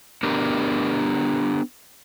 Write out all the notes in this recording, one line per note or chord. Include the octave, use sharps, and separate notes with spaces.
B3 D4 G4 A#4